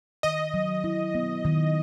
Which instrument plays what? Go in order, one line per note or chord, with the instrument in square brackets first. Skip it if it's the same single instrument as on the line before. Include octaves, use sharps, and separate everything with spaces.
[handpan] D#3 [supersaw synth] D#5
[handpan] F#3
E4
B3
D#3